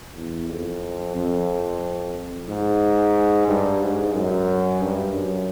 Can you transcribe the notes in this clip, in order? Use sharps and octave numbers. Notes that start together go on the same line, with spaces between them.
E2
F2
F2
G#2
G2
G#2
F#2
G2
F#2